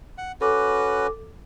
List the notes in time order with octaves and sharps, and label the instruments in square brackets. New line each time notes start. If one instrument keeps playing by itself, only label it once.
[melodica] F#5
[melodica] C#4 F#4 B4 [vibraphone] A4 D6